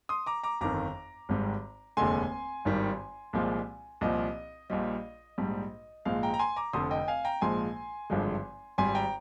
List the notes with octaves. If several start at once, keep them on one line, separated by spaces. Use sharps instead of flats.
C6 D#6
A#5 D6
A#5 D6
G1 F2 D#3 A#5 D6
G#1 G#2 G3
F1 D#2 D3 G#3 G#5 C6
G#1 G2 D#3 G3
C2 A#2 F3 G#3
C2 A#2 F3 D#5
A#1 A#2 G3 D#5
A#1 G#2 G3
A#1 G#2 F3 G#3 F5
G5 A#5
A#5
G#5 C6
A#5 D6
F1 F2 D3 C6 D#6
D#5 G5
F5 G#5
G5 A#5
A#1 G#2 F3 G#3 G#5 C6
G#1 G2 D3 F3 G#3
G#1 G#2 G3 G#5 C6
G5 A#5